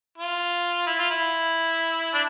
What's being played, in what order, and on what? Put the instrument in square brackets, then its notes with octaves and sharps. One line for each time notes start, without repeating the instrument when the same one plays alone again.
[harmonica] F4
E4
F4
E4
D4